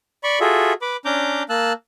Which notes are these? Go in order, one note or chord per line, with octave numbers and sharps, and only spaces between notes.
D5 B5 C#6
F4 F#4 G#4 A4 E5
B4 B5 D6
C#4 D4 A#5 D6 G6
A#3 A5 E6 F#6